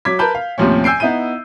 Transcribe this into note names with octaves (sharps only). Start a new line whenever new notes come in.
F#3 D6 G#6 B6
A#4 B4 A5 B5 G6
F5
D#2 A2 C3 F3 C4 C#4
G#5 E6 G6 C7 D7
B3 D#4 E4 G6 D#7